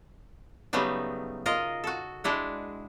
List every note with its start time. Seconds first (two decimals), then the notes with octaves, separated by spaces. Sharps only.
0.73 C#3 F#3 G3 A3 B3 D#4
1.46 F4 A#4 D#5
1.84 F#4 A4
2.24 G#3 D4 E4 F#5